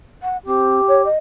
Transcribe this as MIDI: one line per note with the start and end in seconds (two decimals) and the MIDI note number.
0.23 0.37 78
0.46 0.81 60
0.46 1.05 67
0.88 1.02 73
1.05 1.18 75